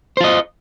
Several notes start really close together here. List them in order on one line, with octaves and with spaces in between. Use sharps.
C5 F4 D#5